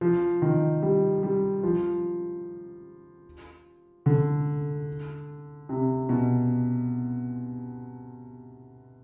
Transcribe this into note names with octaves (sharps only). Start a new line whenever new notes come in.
F3
D#3
G3
G3
F3
D3
C3
B2